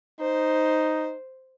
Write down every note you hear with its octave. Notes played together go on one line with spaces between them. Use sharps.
D#4 C5